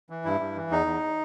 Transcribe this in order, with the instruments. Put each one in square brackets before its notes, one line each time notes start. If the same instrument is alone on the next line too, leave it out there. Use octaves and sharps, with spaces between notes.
[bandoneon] E3
G2 E4
G2
E3
E2 D#4
E2